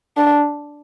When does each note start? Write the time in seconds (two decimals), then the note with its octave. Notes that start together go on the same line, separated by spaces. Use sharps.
0.17 D4